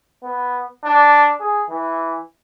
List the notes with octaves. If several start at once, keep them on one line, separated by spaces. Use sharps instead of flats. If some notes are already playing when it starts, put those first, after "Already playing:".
B3
D4
G#4
E3